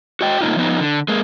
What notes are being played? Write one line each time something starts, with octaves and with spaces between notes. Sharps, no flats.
F#4 D#5 G5
A2 A#3 D#4 F4
F3 B3 D#4
D3
G#3 A#3